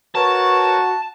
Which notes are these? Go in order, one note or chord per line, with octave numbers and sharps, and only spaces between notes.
F#4 A#4 B4 C#5 A5